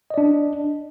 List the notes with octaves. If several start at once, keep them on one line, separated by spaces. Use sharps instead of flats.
D4 D5 D#5